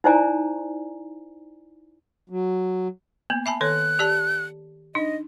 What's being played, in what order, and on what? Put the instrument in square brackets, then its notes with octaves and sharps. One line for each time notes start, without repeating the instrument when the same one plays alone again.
[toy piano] D#4 E4 C5 D5 G#5 A#5
[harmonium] F#3
[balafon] A#3 B3
[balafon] E5 G#5 A5 [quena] B5
[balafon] D#3 A4 C#5 [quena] F#6
[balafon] G4 D5 A5
[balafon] D4 D#4 [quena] D#5